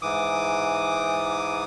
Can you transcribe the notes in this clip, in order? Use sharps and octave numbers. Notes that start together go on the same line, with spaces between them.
G#2 E3 D6 D#6